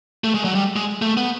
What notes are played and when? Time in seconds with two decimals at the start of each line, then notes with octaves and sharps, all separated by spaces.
0.24 A3
0.34 G#3
0.45 F#3
0.55 G3
0.76 G#3
1.02 A3
1.17 B3